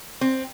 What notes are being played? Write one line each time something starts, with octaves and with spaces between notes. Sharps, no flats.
C4